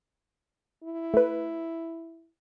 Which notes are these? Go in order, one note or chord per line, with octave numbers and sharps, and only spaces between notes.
E4
A3 B4